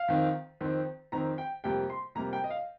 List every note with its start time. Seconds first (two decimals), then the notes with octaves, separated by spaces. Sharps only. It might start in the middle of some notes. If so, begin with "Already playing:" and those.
Already playing: F5
0.08 F2 D#3 C4
0.61 F2 D#3 C4
1.12 F2 D#3 C4 A#5
1.38 G5
1.64 F2 C3 G3 A#3 G5
1.90 C6
2.15 F2 C3 G3 A#3 A#5
2.33 G5
2.44 D#5
2.50 F5